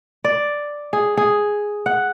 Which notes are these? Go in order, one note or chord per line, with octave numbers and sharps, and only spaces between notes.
D5
G#4
G#4
F#5